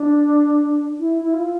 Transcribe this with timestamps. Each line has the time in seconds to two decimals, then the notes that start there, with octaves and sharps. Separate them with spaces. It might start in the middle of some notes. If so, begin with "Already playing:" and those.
Already playing: D4
0.99 E4
1.22 E4
1.34 F4